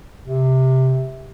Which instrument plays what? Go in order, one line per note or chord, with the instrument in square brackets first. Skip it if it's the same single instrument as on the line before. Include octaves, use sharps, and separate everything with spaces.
[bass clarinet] C3